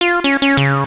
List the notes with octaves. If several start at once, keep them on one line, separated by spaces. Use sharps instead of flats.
F4
C#4
C#4
C#3